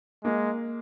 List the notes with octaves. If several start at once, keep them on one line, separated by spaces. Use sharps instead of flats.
G#3 A#3